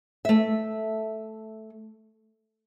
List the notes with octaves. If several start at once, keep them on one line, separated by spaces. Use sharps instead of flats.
A3 E5